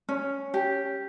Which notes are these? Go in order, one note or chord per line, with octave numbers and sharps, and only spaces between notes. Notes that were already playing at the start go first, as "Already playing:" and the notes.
C#4
G4